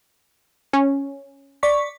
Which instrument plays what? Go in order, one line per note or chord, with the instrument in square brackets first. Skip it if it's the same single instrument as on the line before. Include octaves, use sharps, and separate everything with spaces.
[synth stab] C#4
[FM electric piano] D5 C#6 B6